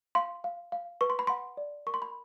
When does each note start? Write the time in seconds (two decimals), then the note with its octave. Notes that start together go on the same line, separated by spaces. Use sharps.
0.15 F5 C6
0.44 F5
0.72 F5
1.01 B4 C#6
1.10 C6
1.19 B5
1.27 F#5 C6
1.57 D5
1.87 A#4 C#6
1.94 C6
2.02 B5